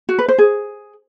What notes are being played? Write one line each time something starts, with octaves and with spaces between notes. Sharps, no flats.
F#4
B4
C5
G#4